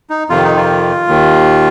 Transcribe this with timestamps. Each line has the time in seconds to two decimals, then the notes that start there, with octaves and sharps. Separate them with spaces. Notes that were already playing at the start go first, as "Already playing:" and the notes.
0.10 D#4
0.29 F2 C3 D#3 F4
0.44 D#4
0.57 F4
1.08 D#2 D#3